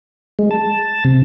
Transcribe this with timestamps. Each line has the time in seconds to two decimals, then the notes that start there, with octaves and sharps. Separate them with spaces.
0.39 G#3
0.51 A5
1.05 C3